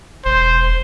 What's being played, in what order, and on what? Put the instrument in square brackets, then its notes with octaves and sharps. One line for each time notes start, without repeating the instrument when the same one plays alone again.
[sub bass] E1 [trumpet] C5